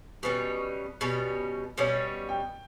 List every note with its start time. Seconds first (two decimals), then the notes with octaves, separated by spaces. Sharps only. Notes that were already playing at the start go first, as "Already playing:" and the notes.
0.23 B2 G3 C#4 B4
1.01 B2 G3 C#4
1.78 B2 G3 C#4 C#5
2.29 G5